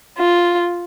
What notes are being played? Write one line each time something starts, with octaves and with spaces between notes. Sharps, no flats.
F4